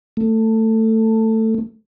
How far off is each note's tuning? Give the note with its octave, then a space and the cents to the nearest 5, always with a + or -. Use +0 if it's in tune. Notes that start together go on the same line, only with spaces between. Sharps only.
A3 +15